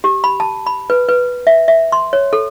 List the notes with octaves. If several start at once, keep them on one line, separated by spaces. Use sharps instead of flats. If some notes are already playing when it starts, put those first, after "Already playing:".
G4
B5
A5
B5
B4
B4
E5
E5
C6
C#5
A4